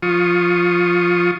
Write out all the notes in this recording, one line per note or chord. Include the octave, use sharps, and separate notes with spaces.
F3 F4 C#6 D#6